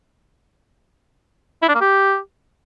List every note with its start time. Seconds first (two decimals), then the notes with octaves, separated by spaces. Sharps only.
1.62 E4
1.68 D4
1.74 A#3
1.81 G4